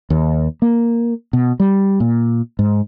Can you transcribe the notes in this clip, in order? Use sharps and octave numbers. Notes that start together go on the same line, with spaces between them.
D#2
A#3
B2
G3
A#2
G#2